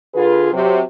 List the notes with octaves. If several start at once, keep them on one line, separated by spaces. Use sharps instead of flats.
D3 F4 G#4 B4
C3 F#3